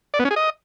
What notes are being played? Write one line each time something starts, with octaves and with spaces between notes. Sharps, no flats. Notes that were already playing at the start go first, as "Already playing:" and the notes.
D5
B3
C#4
G#4
D#5